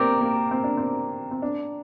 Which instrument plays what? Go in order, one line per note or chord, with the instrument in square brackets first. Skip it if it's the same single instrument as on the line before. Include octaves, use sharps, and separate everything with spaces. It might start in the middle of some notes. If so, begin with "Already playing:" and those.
Already playing: [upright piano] A#3 C4 [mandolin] G4 A#4 D5 G5
[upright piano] A#3
C4
D4
C4
C4
D4